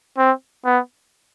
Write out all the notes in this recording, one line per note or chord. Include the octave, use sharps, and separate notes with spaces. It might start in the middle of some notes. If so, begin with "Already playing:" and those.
C4
B3